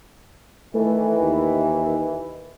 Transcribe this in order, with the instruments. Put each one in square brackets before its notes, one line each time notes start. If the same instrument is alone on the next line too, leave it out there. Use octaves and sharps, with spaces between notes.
[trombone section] D#3 E3 [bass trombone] A3
[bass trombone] D#2